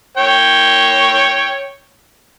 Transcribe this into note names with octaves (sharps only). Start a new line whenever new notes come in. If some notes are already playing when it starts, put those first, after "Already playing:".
C#5 G5